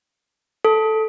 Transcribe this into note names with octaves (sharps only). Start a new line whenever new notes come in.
A4